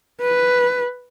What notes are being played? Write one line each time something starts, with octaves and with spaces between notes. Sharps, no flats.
B4